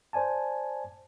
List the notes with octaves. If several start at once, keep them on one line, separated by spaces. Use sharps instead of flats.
C5 D5 G#5 A5